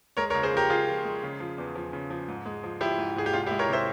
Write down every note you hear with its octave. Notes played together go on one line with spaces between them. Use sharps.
G#3 A#4 C#5
A#4 C#5
C#2
G#4 C5
F3 G4 A#4
C#2 F4 G#4
F3
G#3
C#3
F3
E2
F3
C#3
F3
G#2
G#3
F3
F3 E4 G4
G#2
G#2 G#4
G4
C2 F4
E4 G4
G#3
A#4 C#5
C3 C5 E5